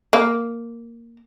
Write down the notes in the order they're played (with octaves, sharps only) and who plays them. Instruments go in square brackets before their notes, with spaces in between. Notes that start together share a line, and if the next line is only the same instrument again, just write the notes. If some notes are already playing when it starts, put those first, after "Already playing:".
[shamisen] A#3